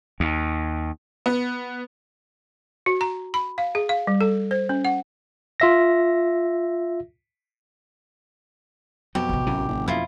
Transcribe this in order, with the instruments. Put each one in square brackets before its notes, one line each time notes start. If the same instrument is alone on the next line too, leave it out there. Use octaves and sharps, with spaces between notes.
[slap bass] D#2
[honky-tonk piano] B3
[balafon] F#4
A#5
B5
F5
G#4
F5
G3
A4
C5
C#4
F#5
[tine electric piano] F4 E5 A#6
[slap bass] F2 F#3 [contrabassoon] B2 [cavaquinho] G4
[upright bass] A1 C3
[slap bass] B1 B2 E3 [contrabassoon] F#2
[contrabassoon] F#1
[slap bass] F2 B2 [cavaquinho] E4 F4